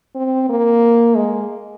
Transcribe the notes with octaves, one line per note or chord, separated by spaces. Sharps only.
C4
A#3
G#3